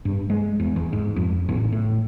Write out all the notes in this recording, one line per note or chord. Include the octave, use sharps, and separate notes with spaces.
G2
G#3
E2
E2
G#2
F2
A1
A2